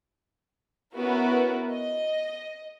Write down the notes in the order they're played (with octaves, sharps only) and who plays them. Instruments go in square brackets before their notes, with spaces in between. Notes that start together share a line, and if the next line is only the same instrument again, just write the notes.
[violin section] B3 C#4 E4 F#4 A#4 B4
D#5